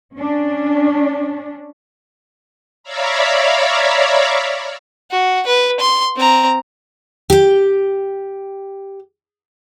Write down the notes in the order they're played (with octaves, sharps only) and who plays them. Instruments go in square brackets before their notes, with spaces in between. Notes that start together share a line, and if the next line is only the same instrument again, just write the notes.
[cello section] C#4 D4
[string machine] C#5 D5 E5 F5 A#5 B5
[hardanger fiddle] F#4
B4
C6
C4 A#5
[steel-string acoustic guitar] G4 G5